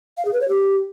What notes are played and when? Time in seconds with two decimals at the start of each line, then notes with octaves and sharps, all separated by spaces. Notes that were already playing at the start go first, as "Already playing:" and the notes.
0.17 F5
0.25 G#4
0.33 B4
0.41 C#5
0.48 G4